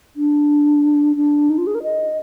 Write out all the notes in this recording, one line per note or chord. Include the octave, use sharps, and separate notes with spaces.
D4
D4
D#4
F4
G#4
A#4
D#5